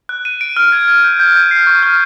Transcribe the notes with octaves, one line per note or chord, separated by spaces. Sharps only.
F#6
D#7
D7
F6
G#6
G#6
G6
G6
G6
C7
C#6
F6